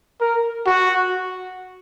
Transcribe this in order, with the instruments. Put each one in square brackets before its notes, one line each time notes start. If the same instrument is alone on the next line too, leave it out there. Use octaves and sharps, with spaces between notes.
[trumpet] A#4
F#4